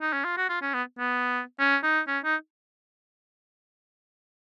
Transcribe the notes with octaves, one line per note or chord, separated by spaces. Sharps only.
D#4
C#4
F4
F#4
F4
C#4
B3
B3
C#4
D#4
C#4
D#4